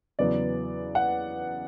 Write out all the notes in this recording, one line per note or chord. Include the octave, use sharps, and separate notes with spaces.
E2 C#3 F#3 B3 D5
F#5